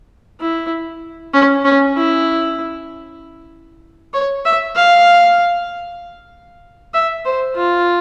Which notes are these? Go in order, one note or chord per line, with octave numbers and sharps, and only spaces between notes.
E4
C#4
C#4
E4
C#5
E5
F5
E5
C5
F4